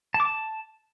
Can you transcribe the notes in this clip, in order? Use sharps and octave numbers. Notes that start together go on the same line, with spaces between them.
A5
D6
A5